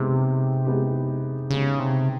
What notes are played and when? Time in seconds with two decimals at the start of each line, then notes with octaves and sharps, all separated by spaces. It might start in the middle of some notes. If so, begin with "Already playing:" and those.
Already playing: C3 G#3 B3 D#4 G4
0.65 G#3 B3 D#4 G4
1.50 C#3 G#3 B3 D#4 G4
1.79 C3